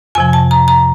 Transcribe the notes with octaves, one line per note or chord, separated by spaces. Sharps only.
F2 C3 F3 G#5
A5
A#5
A#5